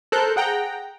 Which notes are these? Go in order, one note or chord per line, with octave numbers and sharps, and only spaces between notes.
A4 A#4 C5 F#6 G6
G#4 F#5 G5 A#5